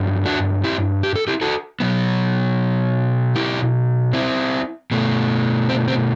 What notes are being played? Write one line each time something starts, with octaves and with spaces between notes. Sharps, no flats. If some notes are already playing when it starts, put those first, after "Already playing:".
Already playing: G2 F#3 B3
D4 F#4
E4 G4
G4
A4
E4 G4
F#4 A4
B2 F#3 B3
E4 G4
C4 E4
B2 A3
C4
C4